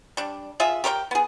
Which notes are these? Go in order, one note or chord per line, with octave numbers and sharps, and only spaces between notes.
G3 D4
F4 G#4 E5
G4 A#4 C5 G5
B3 G#4